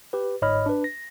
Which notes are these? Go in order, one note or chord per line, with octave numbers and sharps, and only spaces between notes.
G4 B4
G1 G#2 C#5 D#5 B5 F6
D4 B4
A#6